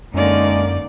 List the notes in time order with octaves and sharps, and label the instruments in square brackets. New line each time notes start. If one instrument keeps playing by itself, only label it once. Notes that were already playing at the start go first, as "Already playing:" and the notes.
[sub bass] F#2 [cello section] D3 A#3 C#4 [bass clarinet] G#3 [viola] D#4 D5